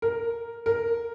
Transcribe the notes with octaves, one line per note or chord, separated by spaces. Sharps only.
A#4
A#4